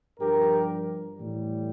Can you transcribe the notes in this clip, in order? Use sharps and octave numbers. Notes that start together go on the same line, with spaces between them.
G2 F3 G4 A#4
A2 E3 G3